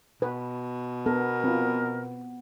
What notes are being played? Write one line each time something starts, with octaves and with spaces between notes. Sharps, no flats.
B2 B4
B3 A4 A#4
C4 F4